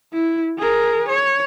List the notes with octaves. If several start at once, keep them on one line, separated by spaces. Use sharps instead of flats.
E4
G#4 A#4
C#5